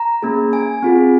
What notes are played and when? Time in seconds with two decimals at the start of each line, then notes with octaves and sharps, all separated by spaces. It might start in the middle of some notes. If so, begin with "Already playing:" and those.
Already playing: A#5
0.22 A#3 C#4 G#4
0.53 G#5
0.83 C4 F4 G#4